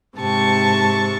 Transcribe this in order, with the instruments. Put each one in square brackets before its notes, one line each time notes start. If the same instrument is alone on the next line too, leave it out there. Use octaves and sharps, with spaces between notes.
[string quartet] G#2 C3 A5 C#6